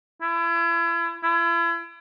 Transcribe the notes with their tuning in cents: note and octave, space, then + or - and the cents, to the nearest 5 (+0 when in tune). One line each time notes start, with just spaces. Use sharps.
E4 +35
E4 +40